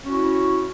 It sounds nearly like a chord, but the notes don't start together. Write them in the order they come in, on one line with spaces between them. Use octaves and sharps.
C#4 F#4 E4